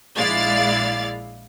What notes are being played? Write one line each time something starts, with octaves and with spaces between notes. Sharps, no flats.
A#1 G#3 E4 D5 F5 A6